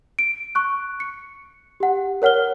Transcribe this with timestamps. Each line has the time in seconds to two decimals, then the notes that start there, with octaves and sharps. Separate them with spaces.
0.19 D7
0.55 C#6 F#6
1.00 C#7
1.80 G4 F#5
2.22 A#4 C#5 F#5 F6 G7